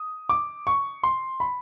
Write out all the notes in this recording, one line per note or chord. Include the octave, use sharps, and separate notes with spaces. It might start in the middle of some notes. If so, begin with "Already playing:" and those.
Already playing: D#6
D6
C#6
C6
B5